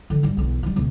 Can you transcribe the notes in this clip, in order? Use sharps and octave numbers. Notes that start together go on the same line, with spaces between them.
D3 D#3
G1 G3
B1 E2
F3 G3
C#2 B2